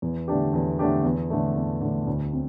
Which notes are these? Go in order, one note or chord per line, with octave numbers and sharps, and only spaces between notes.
E2
D3 A3 D4 G4
E2
D3 A3 D4 G4
E2
D3 A3
E2
D3 A3
D2
C4